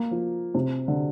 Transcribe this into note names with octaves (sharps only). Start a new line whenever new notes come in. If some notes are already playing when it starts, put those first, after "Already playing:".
Already playing: A#3
F3
C3
D3